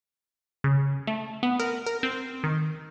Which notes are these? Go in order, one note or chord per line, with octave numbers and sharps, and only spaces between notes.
C#3
A3
B3
A#4
A#4
C4
D#3